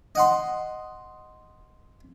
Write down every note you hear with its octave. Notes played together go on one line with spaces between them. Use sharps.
D#5 F#5 C6